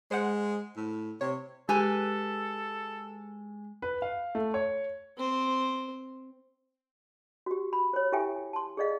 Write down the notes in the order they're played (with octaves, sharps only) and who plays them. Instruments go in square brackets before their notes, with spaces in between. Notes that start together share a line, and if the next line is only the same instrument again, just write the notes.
[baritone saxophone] G#3 [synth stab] C5 F#5
[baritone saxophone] A2
[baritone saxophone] C3 [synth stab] C#5
[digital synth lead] G#3 [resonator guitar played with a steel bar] G4 B4 G#5 [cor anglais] A4
[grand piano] B4
F5
A3
C#5
[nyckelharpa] C4 C5
[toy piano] F#4 G4
B5
C5 C#5
E4 G4 A4 E5 G5 G#5
A5 C6
G#4 A4 D5 D#5 F5